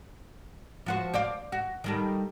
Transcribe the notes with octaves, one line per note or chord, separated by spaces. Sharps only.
F3 F#4 C5
C5 D5 F5
F#4
D#3 G3 A4